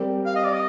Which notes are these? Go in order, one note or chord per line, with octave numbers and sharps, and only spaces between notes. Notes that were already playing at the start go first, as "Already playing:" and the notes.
Already playing: G3 C4 G4 A#4
F5
D#5
D5
D#5